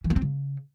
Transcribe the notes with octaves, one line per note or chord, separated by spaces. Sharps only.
E3
A#3
C4
C#3